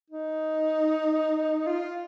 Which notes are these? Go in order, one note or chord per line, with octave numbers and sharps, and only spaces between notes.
D#4
F4